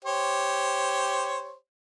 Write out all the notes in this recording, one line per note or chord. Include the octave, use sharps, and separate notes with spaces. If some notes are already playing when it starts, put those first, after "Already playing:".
G4 C5 C#5